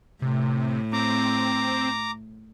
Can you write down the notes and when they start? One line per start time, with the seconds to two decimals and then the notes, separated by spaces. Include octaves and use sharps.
0.22 A2 C3
0.93 C4 A#5 D6